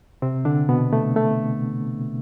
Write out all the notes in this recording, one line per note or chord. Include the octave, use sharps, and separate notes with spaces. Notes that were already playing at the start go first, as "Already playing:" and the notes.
C3 C4
D3 D4
B2 B3
A3
A3